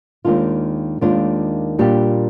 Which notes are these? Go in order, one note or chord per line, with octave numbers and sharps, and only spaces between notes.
D#2 D#3 G#3 D4 F4
D#2 D#3 G#3 D4 F4
A#2 G3 D4 G4